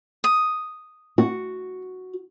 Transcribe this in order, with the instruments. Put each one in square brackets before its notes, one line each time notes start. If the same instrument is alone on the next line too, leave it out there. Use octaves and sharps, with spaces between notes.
[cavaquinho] D#6
[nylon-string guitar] F#4